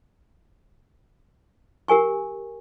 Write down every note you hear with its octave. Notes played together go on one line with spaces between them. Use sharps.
G4 A#4 G#5 C#6